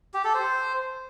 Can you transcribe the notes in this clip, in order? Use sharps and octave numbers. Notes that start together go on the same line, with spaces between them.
G4
A4
C5